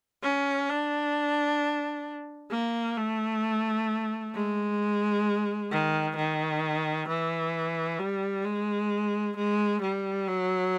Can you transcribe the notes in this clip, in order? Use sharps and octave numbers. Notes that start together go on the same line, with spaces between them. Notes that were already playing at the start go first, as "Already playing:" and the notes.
C#4
D4
A#3
A3
G#3
D#3
D#3
E3
G3
G#3
G#3
G3
F#3